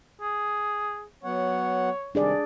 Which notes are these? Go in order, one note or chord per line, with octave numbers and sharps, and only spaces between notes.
G#4
F#3 B3 C#5 F#5
C3 D#3 G3 D4 G#4 D5